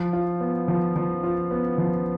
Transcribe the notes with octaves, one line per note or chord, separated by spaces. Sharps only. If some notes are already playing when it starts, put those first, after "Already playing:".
Already playing: F3
F4
B3
F3
F3
F4
B3
F3